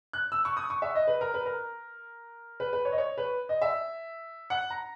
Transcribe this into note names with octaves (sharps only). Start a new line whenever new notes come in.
F#6
E6
C#6
D#6
C#6
E5
D#5
B4
A#4
B4
A#4
B4
B4
C#5
D#5
C#5
B4
D#5
E5
F#5
A#5